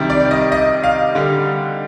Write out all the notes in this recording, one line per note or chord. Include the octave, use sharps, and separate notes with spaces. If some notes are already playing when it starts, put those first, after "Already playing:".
Already playing: C3 D#3 G3
D5
D#5
D#5
F5
D3 G3